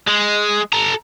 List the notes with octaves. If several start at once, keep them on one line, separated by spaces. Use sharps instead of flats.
G#3
A4 A#5